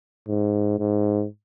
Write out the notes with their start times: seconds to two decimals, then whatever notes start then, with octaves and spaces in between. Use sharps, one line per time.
0.28 G#2
0.79 G#2